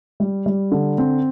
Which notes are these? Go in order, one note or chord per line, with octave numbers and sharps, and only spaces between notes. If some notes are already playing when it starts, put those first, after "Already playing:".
G3
G3
D3
C4